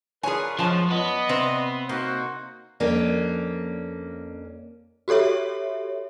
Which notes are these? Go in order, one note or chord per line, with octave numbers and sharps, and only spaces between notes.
D4 F4 G#4 A#4 B4 C#5 G#5
F#2 F3 G#3 C#4 A5
B3 D5 D#5 B5
C3 C4 B4
A#3 D#4 F#4 C5
F2 A#3 C#4 D4
F#4 G4 A4 C#5 E5